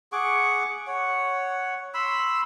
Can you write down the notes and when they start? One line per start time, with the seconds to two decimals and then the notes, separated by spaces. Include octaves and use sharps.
0.12 G#4 F#5 C#6 D6
0.87 C#5 F#5
1.94 B5 C6 E6